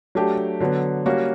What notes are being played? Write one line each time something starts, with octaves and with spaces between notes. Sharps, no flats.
F#3 A3 D4 G4
D3 F#3 B3
G3 A#3 C#4 F#4